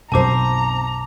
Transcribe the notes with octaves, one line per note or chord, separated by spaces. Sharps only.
B1 F#2 B2 C4 C5 A5 A#5 D6